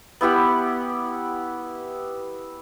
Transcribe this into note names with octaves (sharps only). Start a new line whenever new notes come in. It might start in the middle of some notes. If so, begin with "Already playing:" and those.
B3 E4 G4 F#5